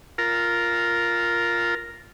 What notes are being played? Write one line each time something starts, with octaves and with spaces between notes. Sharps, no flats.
F4 A#4